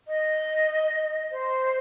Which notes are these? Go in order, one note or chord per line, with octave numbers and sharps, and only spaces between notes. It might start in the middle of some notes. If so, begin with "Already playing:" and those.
D#5
C5